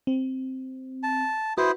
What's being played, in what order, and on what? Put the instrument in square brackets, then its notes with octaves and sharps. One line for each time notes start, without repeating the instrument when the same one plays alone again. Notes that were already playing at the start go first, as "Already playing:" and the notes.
[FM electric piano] C4
[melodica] A5
[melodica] E4 C5 D#6 [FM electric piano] F#4 B4